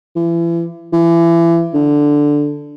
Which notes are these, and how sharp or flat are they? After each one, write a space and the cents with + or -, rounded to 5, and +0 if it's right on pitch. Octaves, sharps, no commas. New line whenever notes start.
E3 +35
E3 +30
D3 +0